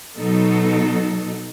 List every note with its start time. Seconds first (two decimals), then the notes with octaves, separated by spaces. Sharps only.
0.18 B2 F#3 D#4 A4